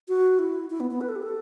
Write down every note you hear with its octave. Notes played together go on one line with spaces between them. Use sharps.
F#4
E4
E4
B3
B3
B4
A4
G4
A4